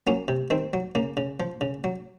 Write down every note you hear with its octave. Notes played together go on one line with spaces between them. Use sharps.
F#3 A#3 C#4
C3
D#3 C4
F#3
C#3 A#3
C#3
F3
C#3
F#3